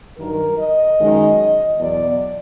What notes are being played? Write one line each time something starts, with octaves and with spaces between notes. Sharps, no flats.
G2 D#3 F#3 A#4
D#5
F#2 D#3 G#3
E2 B2 F#3 D5